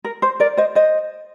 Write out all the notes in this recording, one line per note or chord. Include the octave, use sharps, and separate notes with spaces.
A#4
C5
A#4 D5
C5 D#5
C5 D#5